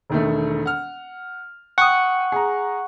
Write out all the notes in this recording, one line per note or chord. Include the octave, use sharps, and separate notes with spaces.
E1 D#3 A3
F#5 F6
F#5 G5 C#6 D#6
G#4 A#5